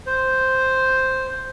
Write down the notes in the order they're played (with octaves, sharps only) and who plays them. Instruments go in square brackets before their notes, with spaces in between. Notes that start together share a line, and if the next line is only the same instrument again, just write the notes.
[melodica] C5